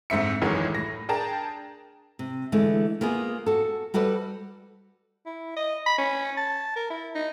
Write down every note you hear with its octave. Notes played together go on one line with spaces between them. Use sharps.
D2 G#2 C4 E5 C#7
A1 D2 D#3 E3 F#3 G#3
A2 A#6
D4 G#4 A#4 G5 A5 A#5
C3
D3 E3 G#3 A3
A#3 B3 F4 G#4
F#4 A4
G3 F#4 A4 B4 D5
E4
D#5
B5
C#4
A5
A#4
E4
D#4